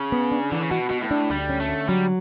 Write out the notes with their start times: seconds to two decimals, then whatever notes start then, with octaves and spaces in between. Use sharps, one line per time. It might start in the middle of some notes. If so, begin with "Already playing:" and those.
Already playing: C#3
0.12 B3
0.32 D4
0.50 D3 E3
0.61 C#3
0.71 B2 F#4
0.90 B2 B3
1.01 A2
1.11 D4
1.30 D2 G3
1.50 C#4
1.60 A3
1.69 D3
1.89 F#3 G3